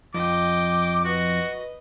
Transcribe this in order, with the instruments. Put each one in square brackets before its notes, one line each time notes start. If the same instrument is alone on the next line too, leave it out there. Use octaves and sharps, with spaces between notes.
[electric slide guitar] F2 F3 [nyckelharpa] D#5 G5 [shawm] D6
[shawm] F#4 [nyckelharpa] B4 D#5